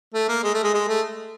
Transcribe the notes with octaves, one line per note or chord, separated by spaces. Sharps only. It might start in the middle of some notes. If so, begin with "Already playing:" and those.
A3
A#3
G#3
A3
G#3
G#3
A3